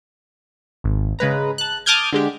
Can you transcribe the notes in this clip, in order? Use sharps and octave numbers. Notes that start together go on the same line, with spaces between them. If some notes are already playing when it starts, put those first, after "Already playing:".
G#1
C#3 G#3 B4 A#5
A5 F#6
A5 D6 D#6 F6 G6 G#6
D3 G#3 G4